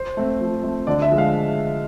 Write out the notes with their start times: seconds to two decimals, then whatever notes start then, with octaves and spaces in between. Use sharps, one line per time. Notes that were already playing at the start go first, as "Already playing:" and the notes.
Already playing: C5
0.17 A3 C4
0.40 F3
0.63 A3 C4
0.87 D3 D5
1.02 E5
1.10 F3 G#3
1.18 F5